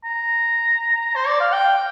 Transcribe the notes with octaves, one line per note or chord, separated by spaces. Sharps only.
A#5
C5
D5
F5
G5